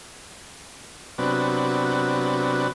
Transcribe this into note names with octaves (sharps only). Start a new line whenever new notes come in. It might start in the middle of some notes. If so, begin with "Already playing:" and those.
C3 F#3 B3 D4